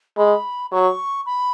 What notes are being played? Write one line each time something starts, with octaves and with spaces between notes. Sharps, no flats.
G#3 B5
F#3 C#6
B5